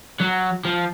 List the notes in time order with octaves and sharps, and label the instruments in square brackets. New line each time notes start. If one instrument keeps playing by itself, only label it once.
[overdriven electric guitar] F#3
F3